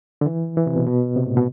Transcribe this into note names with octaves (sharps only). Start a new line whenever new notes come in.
D3
E3
E3
C3
B2
B2
C3
A2
B2